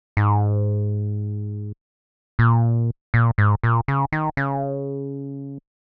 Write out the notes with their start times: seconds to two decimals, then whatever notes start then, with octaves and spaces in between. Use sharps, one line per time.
0.17 G#2
2.39 A#2
3.14 A#2
3.38 G#2
3.63 A#2
3.88 C#3
4.12 D#3
4.37 C#3